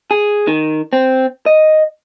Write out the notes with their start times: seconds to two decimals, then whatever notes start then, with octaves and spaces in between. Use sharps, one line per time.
0.11 G#4
0.47 D#3
0.93 C4
1.46 D#5